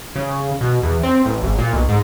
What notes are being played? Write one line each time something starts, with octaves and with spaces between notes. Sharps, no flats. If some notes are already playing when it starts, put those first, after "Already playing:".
C#3
B2
E2
C4
A1
G#1
A#2
B1
G#2